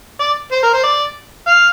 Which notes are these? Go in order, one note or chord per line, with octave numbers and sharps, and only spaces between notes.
D5
C5
A#4
C5
D5
F5